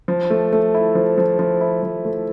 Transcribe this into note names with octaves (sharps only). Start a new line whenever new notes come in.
F3
A3
A3
E4
F3
F3
F3
E4
F3
A3